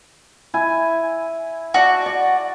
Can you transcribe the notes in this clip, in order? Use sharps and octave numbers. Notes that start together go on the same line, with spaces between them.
E4 G#5
F#4 D5 A5
D5